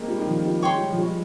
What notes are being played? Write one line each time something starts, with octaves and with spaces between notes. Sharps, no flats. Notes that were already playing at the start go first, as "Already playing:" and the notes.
Already playing: G#3 A#3 C4
G3
D#3
F3
G3
G3
G#3 C#5 G5 C6
G3
F3
G3
G#3